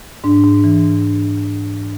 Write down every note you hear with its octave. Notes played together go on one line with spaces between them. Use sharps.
G#2 D4
G#2
E3